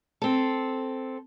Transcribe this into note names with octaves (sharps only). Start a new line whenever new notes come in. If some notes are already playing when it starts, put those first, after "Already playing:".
C4 A4